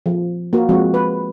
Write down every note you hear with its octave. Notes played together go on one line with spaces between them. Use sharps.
F3
A#3 F#4 A#4
F3 G#3 C4 F#4
B4